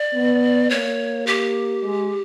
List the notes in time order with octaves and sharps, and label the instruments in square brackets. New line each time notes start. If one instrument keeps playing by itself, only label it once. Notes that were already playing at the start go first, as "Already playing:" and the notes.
Already playing: [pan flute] D5
[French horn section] B3
[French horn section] A#3 [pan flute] C#5
[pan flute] G4
[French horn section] G#3